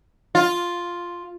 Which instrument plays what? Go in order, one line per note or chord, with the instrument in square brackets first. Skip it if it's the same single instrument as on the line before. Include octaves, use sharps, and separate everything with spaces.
[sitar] F4